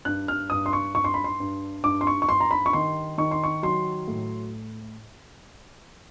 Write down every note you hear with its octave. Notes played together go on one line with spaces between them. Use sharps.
G2 F#6
F6
G2 D#6
C6
C#6
G2 C#6
C6
B5
C6
G2
G2 D6
C6
C#6
C#6
G2 C6
A#5
B5
C#6
D#3 C6
D#3 C#6
C6
C#6
F#3 C6
A2